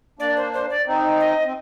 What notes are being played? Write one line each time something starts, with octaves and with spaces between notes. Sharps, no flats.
A#3 D4 D5
C5
C5
D5
C4 D#4
D#5
C4